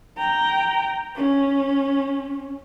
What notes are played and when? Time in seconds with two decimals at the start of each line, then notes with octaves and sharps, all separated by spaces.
0.18 G5 A#5
1.16 C#4